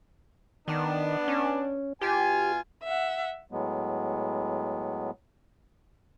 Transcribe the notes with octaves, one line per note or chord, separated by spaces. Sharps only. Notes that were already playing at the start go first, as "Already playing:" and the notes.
D#3 B3 D4
C#4
B2 F4 G4 G#5
E5 F#5
A2 F#3 G#3 B3